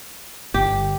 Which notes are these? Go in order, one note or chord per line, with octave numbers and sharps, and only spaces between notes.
G1 G4